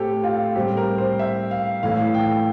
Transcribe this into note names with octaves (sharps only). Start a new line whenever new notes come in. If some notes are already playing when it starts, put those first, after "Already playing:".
Already playing: A2 A3 C4 G4 A4
F4
A2 G3 C4 G4
A#4
C5
E5
F5
A2 E3 A3 E4 F5
G5